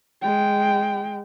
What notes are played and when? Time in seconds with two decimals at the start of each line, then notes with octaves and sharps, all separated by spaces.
0.22 G#3 G5